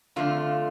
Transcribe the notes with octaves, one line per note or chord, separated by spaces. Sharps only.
F2 D3 A3 F4